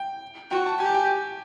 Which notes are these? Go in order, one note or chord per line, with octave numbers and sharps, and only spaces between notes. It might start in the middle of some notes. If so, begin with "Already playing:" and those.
Already playing: G5
F#4 G5
A5
G4 G#5
G5